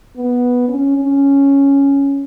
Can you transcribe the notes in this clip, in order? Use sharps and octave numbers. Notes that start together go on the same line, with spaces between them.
B3
C#4
C#4